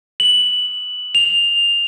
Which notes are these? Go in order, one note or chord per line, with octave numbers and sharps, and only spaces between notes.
F#7
F7